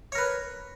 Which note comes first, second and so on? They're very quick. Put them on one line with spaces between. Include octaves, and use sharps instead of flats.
C#5 A#4 B4